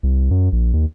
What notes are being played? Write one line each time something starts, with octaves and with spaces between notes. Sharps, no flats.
C2
F#2
A#1
D#2